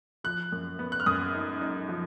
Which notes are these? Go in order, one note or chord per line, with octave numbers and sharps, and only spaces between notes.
F3 F#6
F#2
B3
F#6
F6
F#2 D#6
D#4
D#4
F3